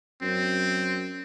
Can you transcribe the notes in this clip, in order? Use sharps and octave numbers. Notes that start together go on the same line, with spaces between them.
F#2 C4